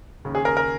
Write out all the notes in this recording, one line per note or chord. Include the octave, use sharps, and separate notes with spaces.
D#2 C#3
G#4
A#4
A#4